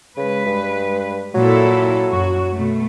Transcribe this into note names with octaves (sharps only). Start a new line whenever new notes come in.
C#3 G#3 B4
G2
A#2 F#3 E4 A4
F#2 F#4
B2 A3